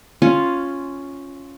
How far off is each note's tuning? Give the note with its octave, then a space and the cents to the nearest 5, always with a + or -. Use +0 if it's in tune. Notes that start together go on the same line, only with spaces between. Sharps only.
C#4 +0 F4 +0 G#5 +0